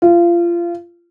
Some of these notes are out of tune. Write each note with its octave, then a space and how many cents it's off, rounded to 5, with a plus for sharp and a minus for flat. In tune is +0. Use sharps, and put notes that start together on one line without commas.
F4 -25